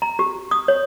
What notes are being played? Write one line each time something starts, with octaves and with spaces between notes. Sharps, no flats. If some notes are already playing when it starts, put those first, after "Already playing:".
A#5
G4
D#6
C#5